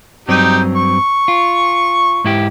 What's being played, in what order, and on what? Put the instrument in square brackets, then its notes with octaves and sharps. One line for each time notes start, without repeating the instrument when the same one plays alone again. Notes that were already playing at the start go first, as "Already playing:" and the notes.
[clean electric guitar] G2 F#3 C4 [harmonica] D#4 G4
[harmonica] C#6
[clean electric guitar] F4
G#2 E4 G4